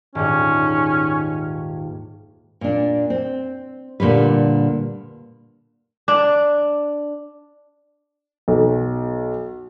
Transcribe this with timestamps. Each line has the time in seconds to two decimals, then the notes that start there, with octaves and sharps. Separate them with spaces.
0.15 D#1 G#2 C#4
2.61 A#2 D4
3.10 C4
4.00 A#2 D3 G3 B4
6.08 D4
8.48 B1